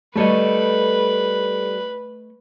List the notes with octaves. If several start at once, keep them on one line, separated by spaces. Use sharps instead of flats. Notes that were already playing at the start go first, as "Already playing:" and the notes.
G3 A3 A4 B4 C#5 D#5